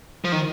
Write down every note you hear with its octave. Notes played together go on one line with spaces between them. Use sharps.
F3
D#3